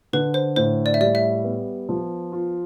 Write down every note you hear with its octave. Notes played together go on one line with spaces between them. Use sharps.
D3 B4
C5
A2 C5
D5
E5
G3 D5
E5
B3
F3
F4